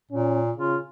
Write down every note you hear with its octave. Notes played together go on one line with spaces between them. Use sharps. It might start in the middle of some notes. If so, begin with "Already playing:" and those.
A#2 C#4
C#3 F4